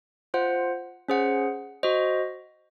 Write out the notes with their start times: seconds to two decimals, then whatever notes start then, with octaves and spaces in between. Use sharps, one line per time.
0.34 F4 C5 F#5
1.08 C#4 G#4 C5 F#5
1.83 F#4 C5 D#5